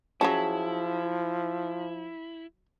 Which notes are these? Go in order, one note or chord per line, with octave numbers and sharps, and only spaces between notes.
F3 F#3 C#4 E4 G#4 A5